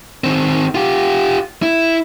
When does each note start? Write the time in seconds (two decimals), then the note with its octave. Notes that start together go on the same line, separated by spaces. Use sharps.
0.24 D#3 C4
0.75 F4 G4
1.62 E4